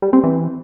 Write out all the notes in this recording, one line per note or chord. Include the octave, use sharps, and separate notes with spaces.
G3
C4
E3